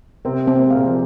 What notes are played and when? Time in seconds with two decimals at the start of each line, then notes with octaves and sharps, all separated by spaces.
0.25 C3 C4 A#4
0.47 C4
0.59 A#3
0.67 G#3
0.70 A#2 A#3 F5
0.86 F3